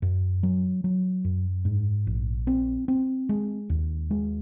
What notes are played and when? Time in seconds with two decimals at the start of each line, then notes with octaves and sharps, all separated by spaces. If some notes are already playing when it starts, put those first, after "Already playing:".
0.02 F#2
0.43 F#3
0.84 F#3
1.24 F#2
1.65 G#2
2.07 A#1
2.47 C4
2.88 C4
3.29 G#3
3.70 D#2
4.11 G#3